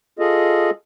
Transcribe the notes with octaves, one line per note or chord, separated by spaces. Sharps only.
F4 G#4 A4 D#5